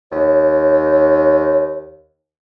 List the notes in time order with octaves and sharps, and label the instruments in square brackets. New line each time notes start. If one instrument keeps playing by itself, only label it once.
[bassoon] D#2 [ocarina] C#5